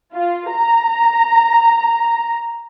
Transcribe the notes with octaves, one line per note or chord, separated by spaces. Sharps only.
F4
A#5